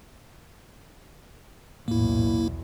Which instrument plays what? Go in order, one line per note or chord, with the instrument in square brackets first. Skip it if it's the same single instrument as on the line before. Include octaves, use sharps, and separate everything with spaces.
[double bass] B1 E2 [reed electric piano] A2 [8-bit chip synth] A#3 E4